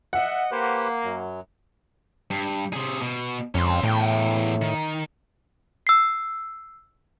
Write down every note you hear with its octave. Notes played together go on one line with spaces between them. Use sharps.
D#5 E5 F#5
A#3 G4 B4 C5
F#2 F#3
G2
C3 G#4
B2
F2 C#4 C6
E2 A2 G5
D#3
E6 C7